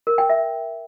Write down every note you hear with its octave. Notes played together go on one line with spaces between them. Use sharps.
A#4
G5
E5